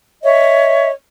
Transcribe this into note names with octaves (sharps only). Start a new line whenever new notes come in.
C#5 D#5 E5